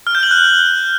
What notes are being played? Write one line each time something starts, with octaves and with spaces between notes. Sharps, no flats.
F6
G6
F#7
F#6